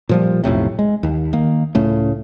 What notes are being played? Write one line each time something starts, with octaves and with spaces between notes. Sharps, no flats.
A#2 F3 G3
B1 F2 A2 C3
G#3
D#2
D#3 A#3
C#2 A2 C#3 A3